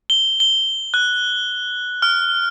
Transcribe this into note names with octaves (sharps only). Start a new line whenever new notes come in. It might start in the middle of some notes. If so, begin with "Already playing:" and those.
G7
G7
F#6
F6